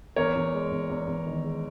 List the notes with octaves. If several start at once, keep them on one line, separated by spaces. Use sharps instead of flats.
E2 A#4 C#5
E2
G#3
E2
E2
E2
D#3
G#3